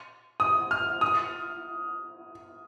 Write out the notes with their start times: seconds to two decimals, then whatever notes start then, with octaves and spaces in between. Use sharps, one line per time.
0.40 D#6
0.71 F6
1.01 D#6